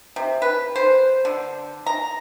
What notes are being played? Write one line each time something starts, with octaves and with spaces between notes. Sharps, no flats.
C3
B4
C5
D3
A#5